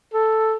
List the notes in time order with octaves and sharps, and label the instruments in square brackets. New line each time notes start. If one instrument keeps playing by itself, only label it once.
[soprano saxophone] A4